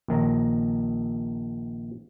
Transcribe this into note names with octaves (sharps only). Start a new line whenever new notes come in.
A#1 D#3 A#5